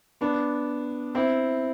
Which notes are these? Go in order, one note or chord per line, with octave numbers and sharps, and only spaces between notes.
B3 D4
C4 E4